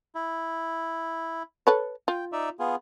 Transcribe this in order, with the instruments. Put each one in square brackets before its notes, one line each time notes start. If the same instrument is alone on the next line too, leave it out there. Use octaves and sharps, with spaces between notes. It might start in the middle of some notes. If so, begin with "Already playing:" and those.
[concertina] E4
[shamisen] A4 B4 C#5
[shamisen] F4 [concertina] G5
[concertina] D#4 D5 E5
B3 F4 G#4